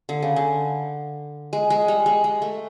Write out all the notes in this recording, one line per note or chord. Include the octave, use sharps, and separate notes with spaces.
D3
C#3
D3
G#3
G#3
G3
G#3
G#3
A3